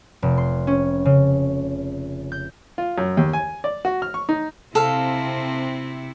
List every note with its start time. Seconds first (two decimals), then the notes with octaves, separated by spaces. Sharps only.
0.22 F1
0.38 C6
0.67 C#4
1.05 C#3
2.32 G6
2.78 F4
2.98 F#2
3.17 D#2
3.33 G#5
3.64 D5
3.85 F#4
4.02 F6
4.14 C#6
4.29 D#4
4.75 C3 C4 E4 A4 F5